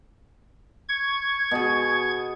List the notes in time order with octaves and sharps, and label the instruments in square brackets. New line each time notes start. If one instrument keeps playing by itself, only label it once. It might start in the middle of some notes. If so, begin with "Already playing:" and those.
[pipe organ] C#6 G#6
[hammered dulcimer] B2 G#4